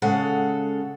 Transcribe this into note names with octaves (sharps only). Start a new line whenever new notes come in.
C#3 G#3 A4 F5 F#5